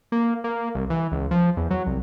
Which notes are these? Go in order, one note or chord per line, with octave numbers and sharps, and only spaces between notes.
A#3
A#3
C2
E3
C#2
F3
E2
F#3
C2